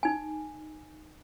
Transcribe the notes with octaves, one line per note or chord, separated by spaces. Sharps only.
D#4 G#5